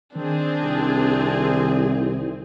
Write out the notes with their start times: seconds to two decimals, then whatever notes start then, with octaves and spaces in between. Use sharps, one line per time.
0.15 D#3 C4 D4 G#4
0.62 C2